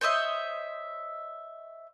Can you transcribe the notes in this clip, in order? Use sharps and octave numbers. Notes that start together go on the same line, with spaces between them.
C5 C#5 D#5 E5